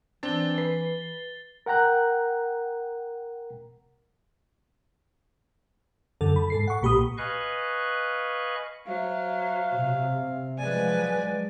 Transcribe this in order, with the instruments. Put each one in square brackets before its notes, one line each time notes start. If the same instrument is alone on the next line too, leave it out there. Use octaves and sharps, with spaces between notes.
[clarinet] E3 [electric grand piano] C4 D4 [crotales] A6 G7
[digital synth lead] B4 [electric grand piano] C7
[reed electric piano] A#4 F#5 G5 A#5 F#6
[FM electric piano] F#2 D3 A4
B5
G#2 A4 C7
F#5 C#6
B1 A#2 G4 B5 D#6
[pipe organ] B4 D#5 F5 G#5 C#6 F#6
[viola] F#3 [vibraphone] C5 E5 [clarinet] F5
[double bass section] C3
[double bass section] F3 F#3 G#3 [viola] B4 G#5 [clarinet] D5